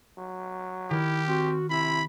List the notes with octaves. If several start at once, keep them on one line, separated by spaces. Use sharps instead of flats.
F#3
D#3 E4 G4 F6
C4 F#4
C3 E4 B5